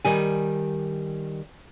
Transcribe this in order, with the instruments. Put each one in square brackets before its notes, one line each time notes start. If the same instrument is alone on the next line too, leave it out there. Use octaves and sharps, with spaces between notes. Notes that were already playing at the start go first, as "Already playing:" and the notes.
[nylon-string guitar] D#3 G3 G#5